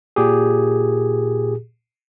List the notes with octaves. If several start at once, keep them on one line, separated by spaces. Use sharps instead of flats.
A#2 G4 G#4